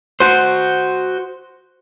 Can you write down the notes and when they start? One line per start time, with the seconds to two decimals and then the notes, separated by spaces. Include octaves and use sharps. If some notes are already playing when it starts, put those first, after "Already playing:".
0.20 F#4 C5